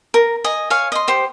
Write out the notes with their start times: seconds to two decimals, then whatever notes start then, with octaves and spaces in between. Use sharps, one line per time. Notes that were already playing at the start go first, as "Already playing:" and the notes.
0.14 A#4
0.44 D#5 G#5
0.70 C#5 F5 G#5
0.92 D#5 C6
1.08 G4 C5